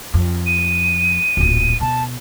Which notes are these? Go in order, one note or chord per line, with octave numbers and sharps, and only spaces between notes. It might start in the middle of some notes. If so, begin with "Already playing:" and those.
F2
D#7
D1 A#1
B2 A5